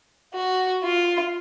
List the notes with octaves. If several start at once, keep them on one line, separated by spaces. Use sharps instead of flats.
F#4
F4